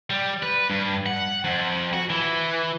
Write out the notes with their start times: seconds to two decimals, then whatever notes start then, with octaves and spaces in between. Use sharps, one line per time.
0.10 G3
0.43 B4
0.70 G2
1.06 F#5
1.44 F2
1.93 F#4
2.10 E3